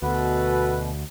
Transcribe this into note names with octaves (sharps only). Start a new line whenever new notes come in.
D2 B2 F#4 A4 B4